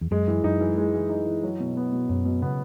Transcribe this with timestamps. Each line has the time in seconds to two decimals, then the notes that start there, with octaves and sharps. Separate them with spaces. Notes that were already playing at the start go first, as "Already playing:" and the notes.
0.01 E2
0.11 F#2 G#3
0.28 E3
0.44 F#2 D#4
0.61 E3
0.78 G#3
0.94 E3
1.10 D#4
1.26 E3
1.43 F#3
1.60 B2
1.77 B3
1.92 B2
2.09 F#2 F#3
2.25 B2
2.42 C#3 B3